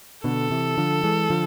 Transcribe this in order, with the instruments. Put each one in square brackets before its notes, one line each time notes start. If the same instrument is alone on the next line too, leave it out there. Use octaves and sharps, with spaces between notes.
[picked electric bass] B2 D3 [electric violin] A4
[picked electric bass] C3 E3
D3 F3
E3 G#3
D3 F3